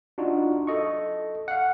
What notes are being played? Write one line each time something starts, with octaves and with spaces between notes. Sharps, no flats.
D4 D#4 F4 F#4
A4 D#5 C#6
F5 F#5